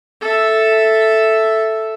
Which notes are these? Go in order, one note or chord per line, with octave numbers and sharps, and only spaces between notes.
A4 E5